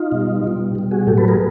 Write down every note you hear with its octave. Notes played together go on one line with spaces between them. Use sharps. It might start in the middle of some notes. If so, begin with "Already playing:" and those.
Already playing: D#4 F4
B2 G3
B2 G3
B2 G3
F#4 G#4
A2 F#3 G4 A4
A4 B4
G#4 A#4